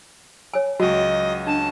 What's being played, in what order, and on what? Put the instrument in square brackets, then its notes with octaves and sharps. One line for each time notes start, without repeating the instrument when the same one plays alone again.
[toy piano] C#5 G#5
[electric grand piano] C#2 F#3 [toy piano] F#4 [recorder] D#5
[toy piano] D4 [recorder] A5